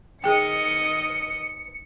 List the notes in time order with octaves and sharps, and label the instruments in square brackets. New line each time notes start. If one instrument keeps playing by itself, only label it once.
[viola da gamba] D#3 D#5 [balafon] G#4 G5 [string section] C#7